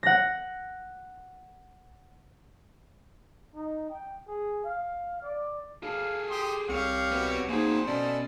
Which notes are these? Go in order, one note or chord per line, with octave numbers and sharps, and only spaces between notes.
F#5 A#6
D#4
G5
G#4
F5
D5
G#4 A4 F5
G4 C6 D#6
C2 G3 C4 C#5 F5 C#7
B3 F#4
A#3 C4 D#4 F#4 G#4 C5
B2 C#4 A4 D5